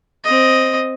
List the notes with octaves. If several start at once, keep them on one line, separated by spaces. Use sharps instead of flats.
C4 D#5